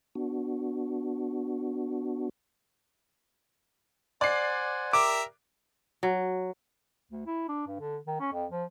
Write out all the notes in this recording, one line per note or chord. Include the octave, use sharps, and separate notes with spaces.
B3 D4 F#4
C5 D5 F#5 G#5 C7
G4 A#4 E5 D6
F#3
D2
E4
D4
G2
D3
D#3
C#4
F2
F3